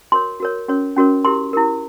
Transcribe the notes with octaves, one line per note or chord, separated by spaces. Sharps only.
F#4 A#4 C#5 C6
F#4 A#4 C#5
C#4 F#4 A#4 C#5
C#4 F#4 A#4 C#5
E4 G4 A#4 C6
E4 G4 A#4